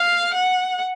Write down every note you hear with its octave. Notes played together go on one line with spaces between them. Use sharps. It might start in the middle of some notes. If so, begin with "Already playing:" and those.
Already playing: F5
F#5